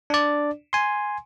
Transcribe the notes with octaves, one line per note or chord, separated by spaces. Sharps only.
D4 D5
G#5 C6